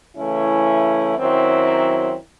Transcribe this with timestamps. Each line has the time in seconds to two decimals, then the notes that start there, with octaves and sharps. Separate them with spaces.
0.17 C#3 E3 A3 C#4 E4
1.16 F#2 D#3 F#3 C4 E4